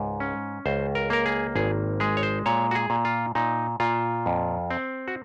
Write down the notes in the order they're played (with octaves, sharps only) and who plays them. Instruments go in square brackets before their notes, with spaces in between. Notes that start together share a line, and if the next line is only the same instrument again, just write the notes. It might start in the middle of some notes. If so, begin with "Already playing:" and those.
Already playing: [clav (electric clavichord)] C#2 G#2
C#4
C#2 C5
A#4
A#3 A#4
G#4
G#1 G#4
G#3 G#4
C#5
C5
A#2 C#5
F#4
G#4
A#2
F4
A#2 D#4
A#2 F4
F2
C4
F#4